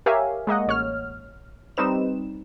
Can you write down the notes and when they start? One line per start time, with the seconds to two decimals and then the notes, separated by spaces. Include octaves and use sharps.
0.06 G4 A#4 C#5 E5 F5 G#5
0.47 G#3 A#3 D#5 F#5
0.67 A1 C#5 F6
1.77 G3 C4 D#4 B4 E7